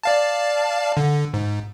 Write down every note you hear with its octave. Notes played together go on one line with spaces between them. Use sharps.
D5 F5 A5
D3
G#2